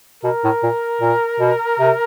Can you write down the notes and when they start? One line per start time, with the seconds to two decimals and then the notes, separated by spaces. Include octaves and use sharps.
0.24 B2 A#4
0.44 A2
0.63 A#2
1.01 A#2
1.40 B2
1.79 C3